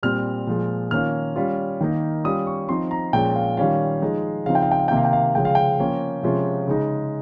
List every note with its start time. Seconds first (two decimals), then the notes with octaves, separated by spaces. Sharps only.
0.03 A#2 G3 C4 F6
0.47 A#2 F3 G#3
0.91 D#3 A#3 C#4 F4 F6
1.36 G3 C#4 F4
1.81 D#3 A#3 D#4
2.24 G3 C#4 F4 D#6
2.47 C#6
2.69 F3 C4 D#4 C6
2.91 A#5
3.13 A#2 F3 G#3 C#4 G5
3.36 F5
3.57 D#3 G3 C#4 F4 F5
4.02 F3 G#3 D#4
4.46 C#3 F3 C4 D#4 F5
4.55 G5
4.62 F5
4.71 G5
4.79 F5
4.88 C3 D#3 A#3 G5
4.97 F5
5.05 G5
5.13 F5
5.35 C#3 F3 G#3 G5
5.45 F5
5.55 G5
5.79 F3 A#3 C#4
6.23 C3 F3 G#3 C#4 F4
6.68 C#3 G#3 D#4